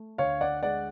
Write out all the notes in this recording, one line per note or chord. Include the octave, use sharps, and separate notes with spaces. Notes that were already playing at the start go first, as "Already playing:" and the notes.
Already playing: A3
D2 C#5 F5
D5 F#5
G#3 D5 F#5